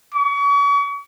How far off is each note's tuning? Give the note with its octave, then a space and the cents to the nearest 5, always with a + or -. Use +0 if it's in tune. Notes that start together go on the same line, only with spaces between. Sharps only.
C#6 +40